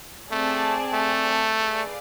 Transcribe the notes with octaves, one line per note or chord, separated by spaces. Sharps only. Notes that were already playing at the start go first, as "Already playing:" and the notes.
A3 C4 G#4 D5 A5
A3
G#4 B4 D5 F5